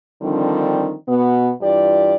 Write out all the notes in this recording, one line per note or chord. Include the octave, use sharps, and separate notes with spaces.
D3 D#3 F3 G3 C4 D4
B2 B3
G2 E3 F4 G4 D5